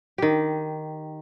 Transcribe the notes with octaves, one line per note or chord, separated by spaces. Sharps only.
D#3 G4